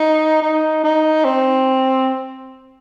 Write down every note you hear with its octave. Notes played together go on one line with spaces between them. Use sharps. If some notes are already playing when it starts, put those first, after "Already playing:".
Already playing: D#4
D#4
D#4
C4